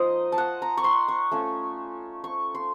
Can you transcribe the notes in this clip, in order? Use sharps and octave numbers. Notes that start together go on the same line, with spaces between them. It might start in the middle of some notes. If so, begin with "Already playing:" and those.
Already playing: F3 A#3 D#4 C5 D#5
A5
F#5
A#5
C#6
C6
C#6
A3 C#4 F4
C#6
C6